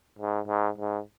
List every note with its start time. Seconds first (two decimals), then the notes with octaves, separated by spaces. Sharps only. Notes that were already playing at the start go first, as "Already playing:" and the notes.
0.19 G#2
0.48 G#2
0.78 G#2